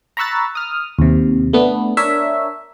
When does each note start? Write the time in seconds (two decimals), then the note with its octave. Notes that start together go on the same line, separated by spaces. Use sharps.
0.17 A#5 B5 C#6 E6 F#6 A6
0.55 D#6 F6
0.99 D#2 C3
1.53 A3 B3 D4
1.97 D4 A#4 C#5 E5